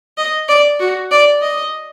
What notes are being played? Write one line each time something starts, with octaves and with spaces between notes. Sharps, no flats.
D#5
D5
F#4
D5
D#5